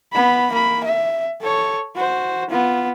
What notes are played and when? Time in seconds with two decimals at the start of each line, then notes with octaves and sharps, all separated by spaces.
0.13 B3 B5
0.52 A#3 B5
0.84 E5
1.41 A4 C#5
1.95 F#4 C5
2.50 B3 F4